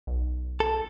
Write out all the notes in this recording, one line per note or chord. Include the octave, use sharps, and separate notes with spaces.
B1
A4